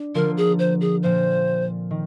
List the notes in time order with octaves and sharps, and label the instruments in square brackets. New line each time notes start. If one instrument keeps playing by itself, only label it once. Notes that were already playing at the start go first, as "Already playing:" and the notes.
Already playing: [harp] D4
[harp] D3 F3 A#3 F4 [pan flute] A#4
[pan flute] G#4
C5
G#4
[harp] A#2 F3 C4 F4 [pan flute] C5
[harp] D#3